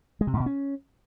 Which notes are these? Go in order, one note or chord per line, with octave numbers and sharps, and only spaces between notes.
G#3
C3
G#2
B2
C#4